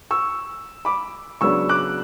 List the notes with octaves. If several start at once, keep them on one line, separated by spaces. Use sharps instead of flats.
C#6 E6
B5 D6
C#3 F#3 B3 D4 C#6 E6
D6 F#6